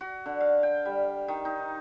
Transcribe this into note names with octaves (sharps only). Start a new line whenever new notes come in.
F#4
D3
F5
G5
G3
D#3
D#4